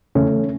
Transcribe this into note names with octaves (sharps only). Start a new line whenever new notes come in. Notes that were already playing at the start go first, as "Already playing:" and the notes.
E2 C#3 E3 A3 C#4